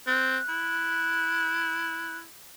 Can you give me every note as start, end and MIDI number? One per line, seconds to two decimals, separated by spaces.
0.07 0.37 60
0.07 2.18 90
0.49 2.23 64